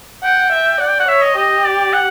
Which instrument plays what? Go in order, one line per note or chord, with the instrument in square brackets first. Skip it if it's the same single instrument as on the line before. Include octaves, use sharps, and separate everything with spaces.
[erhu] F#5 [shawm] G5
[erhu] E5
[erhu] D5 [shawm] F#5
[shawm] G5
F#5
[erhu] C#5 [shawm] E5
[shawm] D#5
[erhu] G4 [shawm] D#5
[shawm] D5
F#5